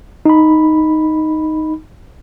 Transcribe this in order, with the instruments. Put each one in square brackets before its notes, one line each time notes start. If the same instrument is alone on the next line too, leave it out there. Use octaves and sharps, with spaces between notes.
[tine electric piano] D#4 B5